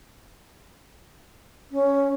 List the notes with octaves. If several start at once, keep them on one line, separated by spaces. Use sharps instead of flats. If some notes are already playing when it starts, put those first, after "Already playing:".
C#4